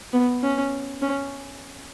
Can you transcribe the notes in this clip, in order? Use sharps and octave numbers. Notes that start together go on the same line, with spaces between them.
B3
C#4
C#4